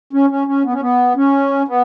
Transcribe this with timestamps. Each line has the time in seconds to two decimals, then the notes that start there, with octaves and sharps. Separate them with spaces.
0.13 C#4
0.30 C#4
0.47 C#4
0.65 B3
0.73 C#4
0.82 B3
1.16 C#4
1.68 B3